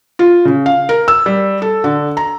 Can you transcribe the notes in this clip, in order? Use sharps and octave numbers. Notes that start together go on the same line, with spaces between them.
F4
C#3
F5
A#4
E6
G3
A4
D3
A#5